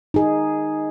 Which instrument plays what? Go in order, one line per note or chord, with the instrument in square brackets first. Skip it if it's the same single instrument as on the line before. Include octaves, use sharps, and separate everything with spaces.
[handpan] D#4 G#4